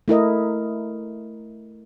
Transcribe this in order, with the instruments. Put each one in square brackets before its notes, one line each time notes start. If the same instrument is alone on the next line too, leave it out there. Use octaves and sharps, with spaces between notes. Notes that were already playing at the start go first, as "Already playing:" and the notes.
[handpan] A3 E4 A#4 D#5